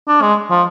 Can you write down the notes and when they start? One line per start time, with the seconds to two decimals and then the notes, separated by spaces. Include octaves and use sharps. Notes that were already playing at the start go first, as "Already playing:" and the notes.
0.08 D4
0.22 G#3
0.50 F3